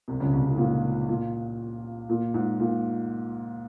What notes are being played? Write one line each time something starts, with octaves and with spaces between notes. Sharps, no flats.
C2 C3
C#2 C#3
C2 C3
C2 C3
G#2
A#2
A#2
A#2
G#2
A#2